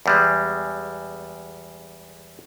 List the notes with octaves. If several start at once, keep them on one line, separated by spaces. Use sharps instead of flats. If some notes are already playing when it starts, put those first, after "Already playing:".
E2 G3 G#3